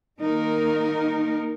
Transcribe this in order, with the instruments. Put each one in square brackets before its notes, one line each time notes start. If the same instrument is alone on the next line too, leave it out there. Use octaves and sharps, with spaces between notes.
[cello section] D#3 A#3 D#4 A#4